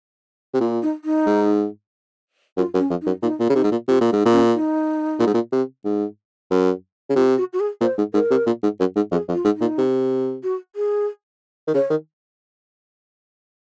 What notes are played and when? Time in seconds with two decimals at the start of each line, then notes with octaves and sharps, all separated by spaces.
0.54 C3
0.61 A#2 F4
0.83 D#4
1.05 D#4
1.26 G#2
2.57 F#2 F4
2.74 F#2
2.79 C#4
2.90 F2
3.01 D#4
3.06 F#2
3.22 A#2 D#4
3.40 A#2
3.50 C#3
3.55 C3 D#4
3.64 G#2
3.72 A#2
3.88 C3 F4
4.01 A#2
4.10 G#2 D#4
4.26 A#2
4.32 C#4
4.54 D#4
5.19 A#2
5.27 G#2
5.34 A#2
5.52 C3
5.85 G#2
6.51 F#2
7.10 C#3
7.16 C3 F4
7.38 F#4
7.53 F#4
7.60 G#4
7.81 A#2 C5
7.98 G#2
8.14 G#2 A#4
8.31 C3
8.47 A#2
8.63 G#2
8.80 F#2
8.96 G#2
9.12 F2 G#4
9.28 F2
9.34 F4
9.45 G#2
9.56 D#4
9.61 A#2
9.78 C3
10.43 F#4
10.76 G#4
11.68 D#3
11.74 C#3 C#5
11.90 D#3